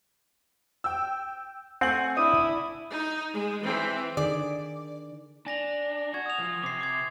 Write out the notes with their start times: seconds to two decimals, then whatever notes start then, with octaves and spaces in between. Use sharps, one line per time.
0.84 G5 E6
1.81 A3 C4 F#5 G#5 F#7
2.17 D4 E4 D#6
2.91 D#4
3.34 G#3
3.63 E3 C4
4.17 D3 D#3 G#4 D5
5.46 D4 G#5 A#6 F7
6.14 F#4 C#6 G#6
6.26 D#6 F7
6.39 F3
6.63 C3 D6 C7
6.81 D6 G#6